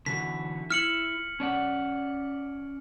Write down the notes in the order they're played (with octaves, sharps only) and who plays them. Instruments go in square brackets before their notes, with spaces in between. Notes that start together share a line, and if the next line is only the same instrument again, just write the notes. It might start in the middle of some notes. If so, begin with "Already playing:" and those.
[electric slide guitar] D3 E3 F#4 [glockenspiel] B6
[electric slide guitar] E4 [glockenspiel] F6 C#7 F#7
[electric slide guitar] C#4 D5 F#5